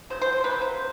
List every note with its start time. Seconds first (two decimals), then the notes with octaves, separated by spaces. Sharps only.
0.10 C#3 F#3 C5
0.22 C5
0.33 C5
0.44 C#3 F#3 A#3 B4
0.62 C5